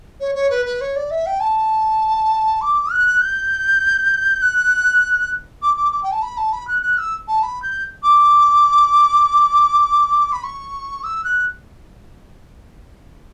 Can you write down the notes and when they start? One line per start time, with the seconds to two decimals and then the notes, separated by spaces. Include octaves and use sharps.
0.20 C#5
0.35 C#5
0.50 B4
0.66 B4
0.81 C#5
0.96 D5
1.11 E5
1.26 G5
1.40 A5
2.61 D6
2.92 F#6
3.21 G6
4.42 F#6
5.62 D6
5.77 D6
5.92 D6
6.03 G5
6.12 A5
6.22 B5
6.37 A5
6.52 B5
6.68 F#6
6.82 F#6
6.98 E6
7.28 A5
7.43 B5
7.62 G6
8.03 D6
10.32 B5
10.44 C#6
11.04 E6
11.24 F#6